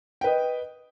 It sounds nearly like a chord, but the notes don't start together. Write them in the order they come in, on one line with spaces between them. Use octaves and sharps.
G5 B4 D#5